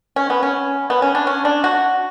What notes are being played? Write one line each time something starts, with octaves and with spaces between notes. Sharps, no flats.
C#4
B3
C#4
B3
C#4
D4
C#4
D4
F#4